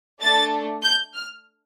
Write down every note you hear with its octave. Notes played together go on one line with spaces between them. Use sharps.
A3 D4 A4 A6
G6
F6